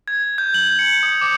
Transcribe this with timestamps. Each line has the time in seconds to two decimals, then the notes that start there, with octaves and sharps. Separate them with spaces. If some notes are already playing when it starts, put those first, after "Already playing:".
0.08 G#6
0.38 G6
0.54 F#7
0.79 C#7
1.03 D#6
1.21 D6